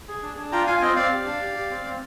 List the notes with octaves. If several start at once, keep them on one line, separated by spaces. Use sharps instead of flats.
G#4
D4
D4
F4 G5 A#5
F4 F5 G#5
G#5
C4 D#5 G5
C4 D5 F5
G4
D4
G4
G4
C4
C4